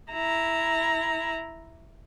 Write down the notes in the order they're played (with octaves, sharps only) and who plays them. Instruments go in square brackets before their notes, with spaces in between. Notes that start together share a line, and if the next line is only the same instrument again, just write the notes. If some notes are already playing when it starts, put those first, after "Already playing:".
[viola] E4 A#5